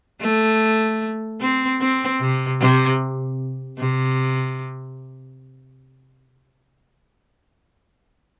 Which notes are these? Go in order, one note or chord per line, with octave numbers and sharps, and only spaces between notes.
A3
C4
C4
C3
C3
C3